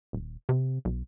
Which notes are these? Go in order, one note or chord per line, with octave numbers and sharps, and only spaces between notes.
D#1
C3
B1